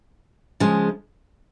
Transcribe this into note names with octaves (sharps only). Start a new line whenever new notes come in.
C#3 F3 G#3